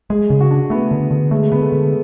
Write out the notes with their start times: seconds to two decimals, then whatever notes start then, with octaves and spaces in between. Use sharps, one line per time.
0.10 G#3 G#4
0.30 C#3
0.40 F#4
0.51 D4
0.70 A3 B3
0.91 D3
1.11 D3
1.31 G#3 A3
1.52 D3 B3
1.61 A3
1.72 D3